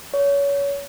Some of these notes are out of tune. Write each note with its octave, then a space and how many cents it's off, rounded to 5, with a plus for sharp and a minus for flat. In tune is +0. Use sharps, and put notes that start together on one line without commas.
C#5 +25